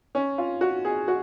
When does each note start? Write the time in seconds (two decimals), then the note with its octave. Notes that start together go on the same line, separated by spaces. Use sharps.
0.15 C#4
0.38 F4
0.61 F#4
0.85 G#4
1.08 F#4